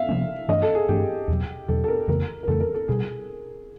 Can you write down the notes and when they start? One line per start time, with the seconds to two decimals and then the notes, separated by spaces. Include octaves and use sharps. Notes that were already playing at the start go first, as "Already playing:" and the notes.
Already playing: E5 F5
0.09 C3 F3 A#3 C#4
0.49 G2 E3 A3 D4 D#5
0.62 A4
0.75 G#4
0.89 G2 E3 A3 D4 G4
1.28 E2 B2 F#3
1.68 E2 B2 F#3 A4
1.84 A4
1.88 A#4
2.08 F2 C#3 E3 A3 A#4
2.43 A#4
2.48 F2 C#3 E3 A3 A4
2.60 A#4
2.75 A4
2.88 B2 G3 G#4